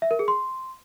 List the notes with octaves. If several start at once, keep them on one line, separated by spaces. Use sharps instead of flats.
E5
A#4
G#4
C6